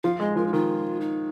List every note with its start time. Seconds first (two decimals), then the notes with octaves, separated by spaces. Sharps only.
0.04 F3 F5
0.20 G#3 D#5
0.36 F3 A#4
0.47 D#4
0.53 D#3 F4
1.01 D#4